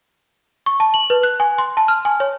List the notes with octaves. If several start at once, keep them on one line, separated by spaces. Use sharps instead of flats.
C#6
A5
F#7
B4
F#6
G#5
C6
A5
F6
G#5
C#5